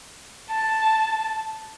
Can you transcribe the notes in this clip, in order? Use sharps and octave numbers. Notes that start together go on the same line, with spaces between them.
A5